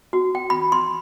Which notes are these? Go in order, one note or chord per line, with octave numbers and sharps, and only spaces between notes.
F#4
G5
B5
C6